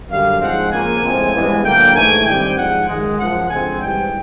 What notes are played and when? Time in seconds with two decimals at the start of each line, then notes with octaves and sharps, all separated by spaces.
0.10 F#2 D3 G3 F5
0.41 G#2 F3 G#3 C4 F#5
0.71 C#3 F3 A#3 G#5
1.03 A2 F3 G#3 C4
1.34 G2 E3 G#3 B3
1.64 D3 F#3 A#3 G5
1.95 G#2 E3 A3 G#5
2.26 G2 D#3 G3 C4 G5
2.57 G#2 F3 G#3 F#5
2.88 F#2 D#3 G#3
3.18 F#2 C#3 F3 F#5
3.49 D3 F3 G#3 C4 G#5
3.81 G#2 E3 G3 G5